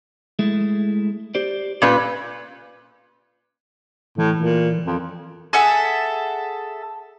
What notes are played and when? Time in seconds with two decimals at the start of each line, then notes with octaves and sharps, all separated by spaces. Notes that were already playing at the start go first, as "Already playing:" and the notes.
0.39 G#3 A3 E4
1.35 G4 C5 D5
1.82 A#2 C#4 B4 D5 B5
4.18 A2 E3
4.36 A#2
4.86 F2
5.53 G#4 A4 E5 F#5